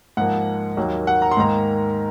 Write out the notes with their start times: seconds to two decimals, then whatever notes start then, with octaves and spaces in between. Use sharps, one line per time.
0.17 G#2 F3 A#3 F#5
0.77 D#2 D#3 F#3 A#3
1.07 F#5
1.22 A#5
1.32 C6
1.37 G#2 D#3 A#3 A#5